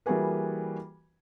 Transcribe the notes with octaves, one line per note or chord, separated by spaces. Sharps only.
E3 G3 A#3 F#4 G#4 B4